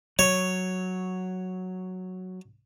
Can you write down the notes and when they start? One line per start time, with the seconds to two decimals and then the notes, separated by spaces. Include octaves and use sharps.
0.19 F#3 C#5